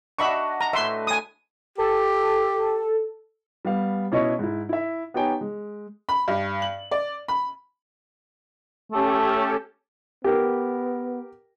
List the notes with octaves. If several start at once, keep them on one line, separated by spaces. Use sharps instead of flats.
D4 F#4 D#5 E5 B5 C#6
A#5
A2 B4 E5 C6
G#5 D#6
G4 A4
G3 B3 F5
B2 C#4 E4 C#5 D#5 C#6
G#2 E4
E4 E5
B3 D#4 G4 C#5 G5 G#5
G#3
B5
G2
F#7
D5
B5
A3 C#4 G4 A4
B3 G4 A#4